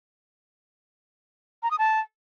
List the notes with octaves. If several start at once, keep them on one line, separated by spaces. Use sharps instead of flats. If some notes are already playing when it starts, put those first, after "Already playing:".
A#5
D#6
A5